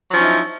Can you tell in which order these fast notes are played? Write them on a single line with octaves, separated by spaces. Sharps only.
F#3 F3 C#4 D#4 E4